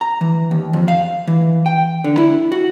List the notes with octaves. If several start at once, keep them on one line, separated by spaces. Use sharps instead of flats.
A#5
E3
D#2
F2
F5
E3
G5
D3
E4
F#4